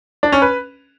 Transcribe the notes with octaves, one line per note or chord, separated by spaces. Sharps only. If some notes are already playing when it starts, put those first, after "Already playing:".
D4
C#4
B4